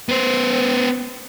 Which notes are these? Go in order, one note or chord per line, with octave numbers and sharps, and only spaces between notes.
B3 C5